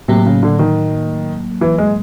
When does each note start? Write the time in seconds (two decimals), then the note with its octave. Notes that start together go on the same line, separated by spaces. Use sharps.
0.08 A2 C3 F#3 A#3
0.26 C#3
0.43 D3
0.59 D#3
1.61 E3
1.78 G#3